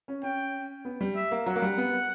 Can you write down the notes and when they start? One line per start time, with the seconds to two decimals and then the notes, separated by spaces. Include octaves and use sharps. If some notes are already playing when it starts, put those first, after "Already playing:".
0.08 C#4
0.23 C#4 G5
0.85 B3
1.01 G3
1.16 E5
1.31 A#3
1.46 F#3 F#5
1.56 A#3
1.62 G3
1.78 B3